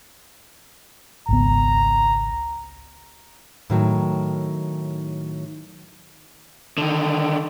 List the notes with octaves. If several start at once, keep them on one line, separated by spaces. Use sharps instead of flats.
G#1 C#2 B3 A#5
A2 D#3 F#3
D3 D#3